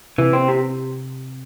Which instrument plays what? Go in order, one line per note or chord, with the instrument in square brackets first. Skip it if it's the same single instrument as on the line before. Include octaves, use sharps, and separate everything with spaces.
[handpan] C3 [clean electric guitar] E3
[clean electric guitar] C4
C3